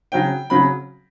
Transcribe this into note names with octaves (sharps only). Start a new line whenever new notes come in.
C#3 F#3 C#4 G5
C#3 F#3 C#4 B5